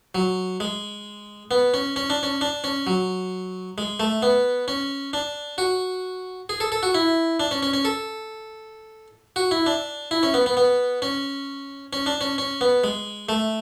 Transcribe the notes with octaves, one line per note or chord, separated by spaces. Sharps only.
F#3
G#3
B3
C#4
C#4
D4
C#4
D4
C#4
F#3
G#3
A3
B3
C#4
D4
F#4
G#4
A4
A4
F#4
E4
D4
C#4
C#4
C#4
A4
F#4
E4
D4
E4
C#4
B3
B3
B3
C#4
C#4
D4
C#4
C#4
B3
G#3
A3